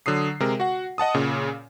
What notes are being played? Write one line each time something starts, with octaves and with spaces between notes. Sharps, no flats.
D3 F#3 D#6 C7
C3 G#3 A#4
F#4 F#5
D#5 F#5 A5 D#6
A#2 C#3